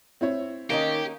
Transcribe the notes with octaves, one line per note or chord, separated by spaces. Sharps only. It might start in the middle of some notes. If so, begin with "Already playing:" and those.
C4 E4 C#5
D#3 A#3 C#4 D#4 G4